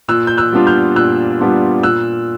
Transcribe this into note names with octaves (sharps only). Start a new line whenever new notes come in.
A#2 E6 F#6
G6
E6 F#6
G3 B3 D4 F4
F6 G6
A#2 E6 F#6
G3 B3 D4 F4
A#2 E6 F#6